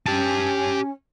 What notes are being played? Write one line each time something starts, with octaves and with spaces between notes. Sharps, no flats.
C#4 G4 A5